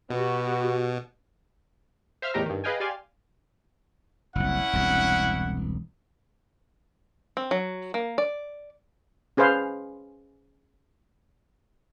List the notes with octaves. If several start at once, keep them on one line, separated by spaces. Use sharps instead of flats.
B2 B3 F#4 G4
C5 E5 F5 E6 F6
E2 A2 D#4 G4 A#4 A#5
G2 D#3
G#4 B4 D#5 F5 G5 G#5
G4 D5 F5 G#5 C6
F#1 C2 C#4 E4 F#5
E1 C2
C4
F#3
A#3
D5
C#4 G#4 B4 C5 F5